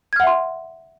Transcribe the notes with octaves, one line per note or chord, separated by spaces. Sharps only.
E5 F#5 C6 F6 G#6